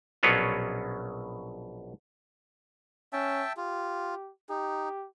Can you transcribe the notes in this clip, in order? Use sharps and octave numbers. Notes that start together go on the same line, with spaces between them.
A#1 B2 F#3 B3 C#4 F4
C#4 E5 G5 A5
F4 G4
D#4 G4